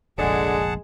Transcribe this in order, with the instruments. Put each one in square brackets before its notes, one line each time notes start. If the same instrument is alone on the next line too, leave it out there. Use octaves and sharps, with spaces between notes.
[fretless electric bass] F1 A#1 [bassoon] D3 [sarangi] G#3 [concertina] G#4 F#5 A5